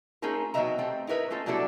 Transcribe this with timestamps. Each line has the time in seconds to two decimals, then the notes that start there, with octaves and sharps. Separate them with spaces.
0.22 A3 C#4 D#4 F4 G#4 A#4
0.54 B2 D#3 F#3 D#5 E5 A#5
0.78 A3 C4 G4
1.07 D#4 E4 A#4 B4 E5
1.30 A3 C#4 F4 A4
1.46 B2 F#3 G3 D4 E4 A4